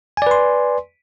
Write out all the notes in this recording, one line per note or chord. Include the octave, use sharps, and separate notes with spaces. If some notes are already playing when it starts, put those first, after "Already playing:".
B4 D5 G#5 C6